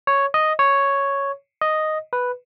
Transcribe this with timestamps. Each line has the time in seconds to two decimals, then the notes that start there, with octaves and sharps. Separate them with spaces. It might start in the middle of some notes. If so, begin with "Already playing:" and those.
0.07 C#5
0.34 D#5
0.59 C#5
1.62 D#5
2.13 B4